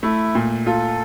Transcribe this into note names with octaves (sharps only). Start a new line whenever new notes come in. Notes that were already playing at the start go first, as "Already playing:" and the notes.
A3 E4
A#2
F4 A4